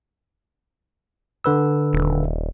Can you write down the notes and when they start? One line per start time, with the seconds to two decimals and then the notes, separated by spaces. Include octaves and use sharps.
1.44 D3 B4 E6
1.93 D#1